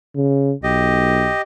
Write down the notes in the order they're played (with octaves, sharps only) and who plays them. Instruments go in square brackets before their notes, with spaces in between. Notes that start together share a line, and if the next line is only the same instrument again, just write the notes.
[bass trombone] C#3
[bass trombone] B1 [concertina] G4 D#5